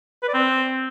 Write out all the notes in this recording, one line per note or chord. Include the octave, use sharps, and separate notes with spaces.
B4
D5
C4